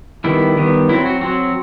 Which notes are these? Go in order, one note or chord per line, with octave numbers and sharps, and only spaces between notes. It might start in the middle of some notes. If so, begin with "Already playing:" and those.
D#3 G3 B3 E4
D#3 G3 B3
F#3 C4 E4
F#4
F#3 C4 F#4